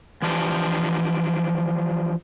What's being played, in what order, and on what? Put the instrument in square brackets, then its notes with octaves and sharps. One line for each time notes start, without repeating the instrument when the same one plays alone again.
[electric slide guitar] E3 F3 D4 G4